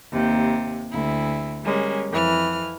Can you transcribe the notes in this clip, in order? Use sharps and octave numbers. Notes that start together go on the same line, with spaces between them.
D#2 C3
D2 E4
G3 G#3 A#3 C#4
F2 E3 F6